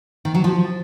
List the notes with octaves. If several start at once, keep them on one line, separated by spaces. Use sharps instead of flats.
D#3
F#3
F3